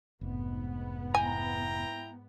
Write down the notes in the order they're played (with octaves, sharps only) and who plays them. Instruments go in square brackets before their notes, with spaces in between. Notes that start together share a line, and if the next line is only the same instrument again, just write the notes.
[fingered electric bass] F1 [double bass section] G#2 B3
[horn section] E4 G5 A#5 [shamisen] G#5